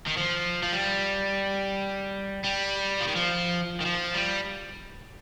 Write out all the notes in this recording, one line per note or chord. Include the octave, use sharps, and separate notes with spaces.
D#3
F3
F3
G3
G3
F3
D#3
F3
D#3
F3
G3